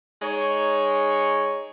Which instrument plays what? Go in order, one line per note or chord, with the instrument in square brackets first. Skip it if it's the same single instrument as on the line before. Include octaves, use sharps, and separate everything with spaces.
[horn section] G#3 D#4 C#5